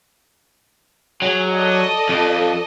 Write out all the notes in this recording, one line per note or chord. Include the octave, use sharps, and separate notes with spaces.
F#3 G#4
A4 D5 D#5
F2